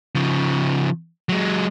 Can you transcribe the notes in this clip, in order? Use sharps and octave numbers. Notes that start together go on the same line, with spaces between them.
C#3 F3
F#3 G#3